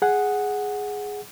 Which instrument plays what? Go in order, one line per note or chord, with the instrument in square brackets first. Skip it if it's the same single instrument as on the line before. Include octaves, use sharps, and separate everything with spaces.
[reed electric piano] G#4 F#5